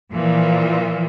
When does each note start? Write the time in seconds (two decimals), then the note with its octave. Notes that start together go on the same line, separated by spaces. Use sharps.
0.12 A#2 E3 F3